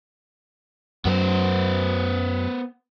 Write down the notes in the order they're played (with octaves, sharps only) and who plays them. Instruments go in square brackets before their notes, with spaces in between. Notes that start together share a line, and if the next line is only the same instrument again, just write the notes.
[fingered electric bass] F#2 F#3 [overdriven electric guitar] B3 C5